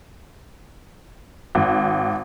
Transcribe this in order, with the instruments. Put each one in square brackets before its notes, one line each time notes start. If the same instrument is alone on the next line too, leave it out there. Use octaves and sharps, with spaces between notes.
[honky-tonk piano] G#1